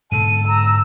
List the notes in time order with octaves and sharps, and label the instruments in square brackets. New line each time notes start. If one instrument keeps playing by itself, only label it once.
[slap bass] G#2 B2 D3 [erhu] A4 [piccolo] D#7
[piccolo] A#5 [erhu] E6